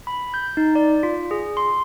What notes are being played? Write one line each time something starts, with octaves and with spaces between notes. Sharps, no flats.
B5
G6
D#4
D5
F4
G#4
C6